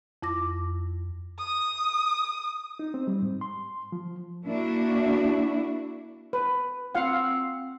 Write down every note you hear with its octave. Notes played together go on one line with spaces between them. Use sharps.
F2 E4 D6 A#6
D#6
D#4
C4
G3
G#2
C6
F3
A#3 D4 E4 F#4
B4
C4 F4 F5 F#5